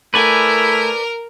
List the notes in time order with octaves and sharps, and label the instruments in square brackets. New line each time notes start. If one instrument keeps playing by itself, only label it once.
[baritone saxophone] A3 [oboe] E4 [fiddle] A#4 [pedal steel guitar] B4 D5 G#5